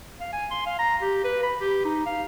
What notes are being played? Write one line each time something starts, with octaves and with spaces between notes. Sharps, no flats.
F5
G#5
C6
F5
A#5
G4
B4
B5
G4
D#4
F5